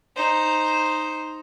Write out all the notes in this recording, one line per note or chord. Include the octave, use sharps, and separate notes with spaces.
D#4 C5